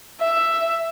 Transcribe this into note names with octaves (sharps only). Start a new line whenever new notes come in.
E5